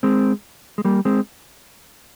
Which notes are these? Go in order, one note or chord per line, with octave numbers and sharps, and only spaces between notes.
G#3 C4
G#3
G3 A#3
G#3 C4